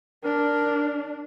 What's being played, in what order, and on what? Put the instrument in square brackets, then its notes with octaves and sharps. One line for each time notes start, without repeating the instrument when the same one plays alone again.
[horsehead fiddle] D4 [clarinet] A#4